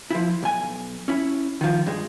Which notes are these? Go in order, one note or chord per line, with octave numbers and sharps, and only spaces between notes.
F3 E4
B1 G#5
C#4 E4
D#3 F3
G2 G#3